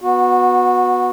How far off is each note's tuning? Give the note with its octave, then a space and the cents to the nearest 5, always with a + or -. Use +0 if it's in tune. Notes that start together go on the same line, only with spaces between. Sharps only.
B3 +0 F#4 -20